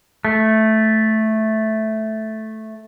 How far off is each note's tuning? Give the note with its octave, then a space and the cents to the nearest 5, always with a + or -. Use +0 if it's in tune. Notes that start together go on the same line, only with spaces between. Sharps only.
A3 -5